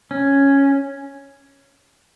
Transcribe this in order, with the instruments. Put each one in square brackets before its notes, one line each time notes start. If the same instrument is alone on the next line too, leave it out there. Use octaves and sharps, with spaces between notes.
[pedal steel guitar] C#4